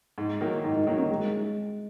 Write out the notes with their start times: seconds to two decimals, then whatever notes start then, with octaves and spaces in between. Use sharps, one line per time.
0.18 G#2 D#4
0.40 D#3 F#3 A#3 E4
0.63 G#2 D#4
0.75 D#4
0.87 D#3 F#3 A#3 D#4
0.97 C#4
1.10 G#3